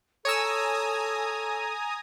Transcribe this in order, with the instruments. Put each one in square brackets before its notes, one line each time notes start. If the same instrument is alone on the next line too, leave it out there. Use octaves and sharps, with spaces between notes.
[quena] A4 [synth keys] C#5 E6 [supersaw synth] G#5 A#5 D#6